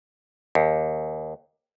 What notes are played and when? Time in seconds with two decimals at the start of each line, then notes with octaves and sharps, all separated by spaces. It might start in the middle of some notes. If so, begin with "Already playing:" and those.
0.55 D#2